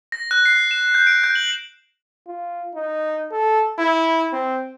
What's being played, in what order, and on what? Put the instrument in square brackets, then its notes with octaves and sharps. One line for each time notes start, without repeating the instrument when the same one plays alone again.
[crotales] A#6
F#6
C7
E7
G6
D7
G6
F#7
[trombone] F4
D#4
A4
E4
C4